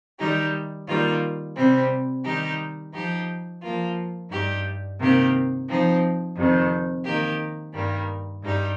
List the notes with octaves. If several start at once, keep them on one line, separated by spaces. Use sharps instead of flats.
D#3 G3 D#4 G4
D#3 G3 A#3 F4
C3 G3 C4
D#3 G3 D#4 G4
F3 D#4 G4
F3 A#3 F4
G2 G3 D#4 G4
C3 D#3 A#3 G4
F3 C4 D#4
F2 C3 D#3
D#3 A#3 G4
G2 D#3 G3 A#3
G2 G3 D#4 G4